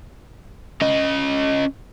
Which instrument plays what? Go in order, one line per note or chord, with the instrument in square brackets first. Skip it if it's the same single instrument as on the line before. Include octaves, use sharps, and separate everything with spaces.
[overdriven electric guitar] C#4 D#5